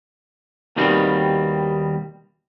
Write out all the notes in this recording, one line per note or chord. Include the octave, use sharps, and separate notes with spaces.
D#2 B2 D#3 G3 C4